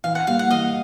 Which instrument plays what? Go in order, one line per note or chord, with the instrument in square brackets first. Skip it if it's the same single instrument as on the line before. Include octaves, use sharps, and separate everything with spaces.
[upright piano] E3 [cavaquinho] F5
[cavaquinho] F#5
[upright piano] G3 A#3 [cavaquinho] F5
[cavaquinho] F#5
[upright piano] E3 [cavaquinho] D#5 F5